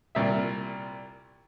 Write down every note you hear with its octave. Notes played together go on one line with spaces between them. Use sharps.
C2 A#2 E5